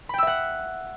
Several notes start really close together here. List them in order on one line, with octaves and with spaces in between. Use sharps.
B5 G5 E6 E5 F#5